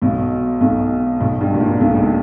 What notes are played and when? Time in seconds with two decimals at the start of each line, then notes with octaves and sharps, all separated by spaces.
0.02 B1 B2
0.61 B1 B2
1.20 B1 B2
1.41 G2
1.54 A#2
1.60 G#2
1.81 B1 B2
1.95 C#2 C#3